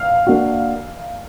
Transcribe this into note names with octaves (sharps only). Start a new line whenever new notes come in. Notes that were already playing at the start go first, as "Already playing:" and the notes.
Already playing: F5 F6
A#3 D4 F#4